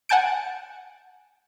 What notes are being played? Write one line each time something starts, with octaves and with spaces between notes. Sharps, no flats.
F#5 G#5 A5 G6 D7